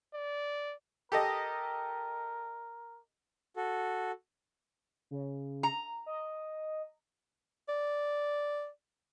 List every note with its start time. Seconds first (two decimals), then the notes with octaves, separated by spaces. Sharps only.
0.14 D5
1.12 G4 A4 A#4 D#5
3.56 F#4 A4
5.11 C#3
5.63 A#5
6.06 D#5
7.69 D5